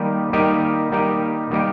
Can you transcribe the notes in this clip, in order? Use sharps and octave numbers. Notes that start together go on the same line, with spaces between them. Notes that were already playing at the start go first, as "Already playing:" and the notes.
Already playing: D#3 G3 A#3 D#4 G4
D#3 G3 A#3 D#4 G4
D#3 G3 A#3 D#4 G4
D#3 G3 A#3 D#4 G4